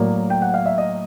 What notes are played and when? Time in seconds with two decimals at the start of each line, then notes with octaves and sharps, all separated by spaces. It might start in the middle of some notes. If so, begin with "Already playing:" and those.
Already playing: A2 F#3 A#3 D5
0.30 G5
0.42 F#5
0.54 F5
0.66 E5
0.78 D#5